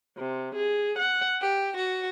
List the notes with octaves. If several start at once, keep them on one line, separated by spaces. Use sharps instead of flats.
C3
G#4
F#5
G4
F#4